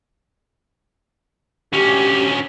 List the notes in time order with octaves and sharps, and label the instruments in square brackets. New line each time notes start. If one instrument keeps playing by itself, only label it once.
[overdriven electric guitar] D2 C#4 [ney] G4